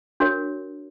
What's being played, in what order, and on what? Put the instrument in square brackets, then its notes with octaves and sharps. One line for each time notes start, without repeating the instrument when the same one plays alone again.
[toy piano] D4 F#4 A#4 C#5